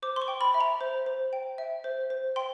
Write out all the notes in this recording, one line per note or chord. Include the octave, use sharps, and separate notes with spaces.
C5 D6
C6
C#6
G5
B5
E5
A#5
C5
C5
G5
E5
C5
C5
G5 C6